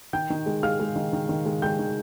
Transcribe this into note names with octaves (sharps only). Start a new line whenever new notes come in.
D#3 G5 G6
D#3
G#3
G#3 F5 F6
G#3
D#3
D#3
D#3
G#3
G#3 G5 G6
D#3